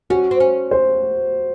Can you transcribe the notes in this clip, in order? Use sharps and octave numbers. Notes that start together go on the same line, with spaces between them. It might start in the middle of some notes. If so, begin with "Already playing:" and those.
C#4 F#4
C4
C#4
C5